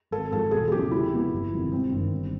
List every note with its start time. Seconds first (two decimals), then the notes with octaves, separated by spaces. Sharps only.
0.11 G#1 A4
0.31 G#2 F3 G#3 A4
0.51 E1 G#4
0.68 G#4
0.72 E2 C#3 F#3 A3 G4
0.91 C3 E4
1.11 F3 G#3 B3
1.32 G1
1.52 F2 C3 D#3 G3
1.72 G#1 C4
1.92 G2 D#3
2.12 G1